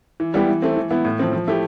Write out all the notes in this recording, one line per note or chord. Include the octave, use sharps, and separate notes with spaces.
E3
G3 B3 E4 G4
E3
A3 C4
E3
B3 E4
A2
F3 C4
F3
A3 E4 G4